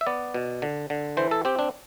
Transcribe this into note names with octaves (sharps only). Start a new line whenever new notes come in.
E5
B3 D5
B2
D3
D3
E3 C5
A4
C4 G4
D4